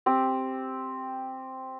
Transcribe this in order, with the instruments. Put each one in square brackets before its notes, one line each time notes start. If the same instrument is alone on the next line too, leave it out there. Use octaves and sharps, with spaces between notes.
[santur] C4 G4